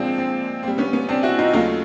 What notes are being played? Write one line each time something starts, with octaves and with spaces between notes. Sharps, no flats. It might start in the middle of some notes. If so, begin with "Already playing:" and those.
Already playing: A#2 F3 G#3 C4 D4
C4
A#2 G3 C4
B3 C#4
B3 C#4
C4 D4
E4 F#4
D#4 F4
D#2 C#3 F#3 A3 D#4 F4